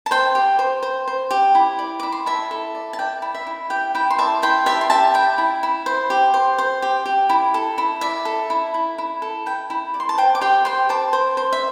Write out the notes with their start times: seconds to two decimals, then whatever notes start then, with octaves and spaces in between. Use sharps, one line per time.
0.06 A5
0.11 C5 G5 C6
0.35 G4
0.59 C5
0.83 C5
1.08 C5
1.31 G4
1.55 E4
1.79 D5
2.00 E4 D6
2.12 C6
2.26 E4 E5 A5
2.51 A4
2.75 D5
2.93 A5
2.99 D5 G5
3.22 E4
3.35 E5
3.47 E4
3.70 G4 G5
3.95 E4 G5
4.10 C6
4.18 D5 E5 A5
4.42 E4 G5 C6
4.66 G4 E5 A5
4.81 C6
4.90 G4 E5 A5
5.14 E4 G5
5.38 E4
5.63 E4
5.86 C5
6.10 G4
6.34 C5
6.58 C5
6.82 G4
7.06 G4
7.29 E4
7.54 A4
7.78 E4
8.01 D5 E5
8.25 A4
8.50 E4
8.74 E4
8.98 E4
9.22 A4
9.46 E4 G5
9.70 E4
9.94 D5
10.00 C6
10.09 A5
10.18 C5 G5
10.35 D6
10.41 G4 G5 C6
10.65 C5 G5 C6
10.89 C5 A5 D6
11.13 C5
11.37 C5
11.52 E5